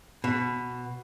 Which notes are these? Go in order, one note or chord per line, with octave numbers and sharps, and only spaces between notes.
B2